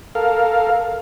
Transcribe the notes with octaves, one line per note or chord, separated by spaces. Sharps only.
A4 A#4 F5